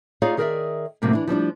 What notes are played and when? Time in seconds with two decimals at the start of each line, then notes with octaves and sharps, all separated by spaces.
0.22 D#4 F4 G#4 C#5 D5 F5
0.37 D#3 G#4 A#4 B4 D5 E5
1.02 D2 A2 C3 F#3 A#3
1.13 E3 D4
1.27 F3 G3 C4 D4